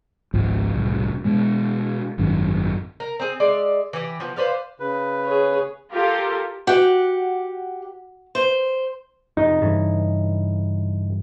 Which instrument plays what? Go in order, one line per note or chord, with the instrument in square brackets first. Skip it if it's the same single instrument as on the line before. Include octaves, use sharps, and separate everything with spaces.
[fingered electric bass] G#1 C#2 G#2 F3
E1 C2 A2
B2 G#3
G#1 F#2 D#3
[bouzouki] A#4
C4 G#4
G#3 D5 E5
E3 G4
F3 B3
B4 C5 D5 F5
[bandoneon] C#3 B4
[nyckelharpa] G#4 C#5
[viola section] F4 G4 A4 A#4
[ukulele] F#4 [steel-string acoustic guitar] G4 F#5
[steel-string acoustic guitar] C5
[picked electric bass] F2 C3 [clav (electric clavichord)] D#4
[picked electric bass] G2 C#3 E3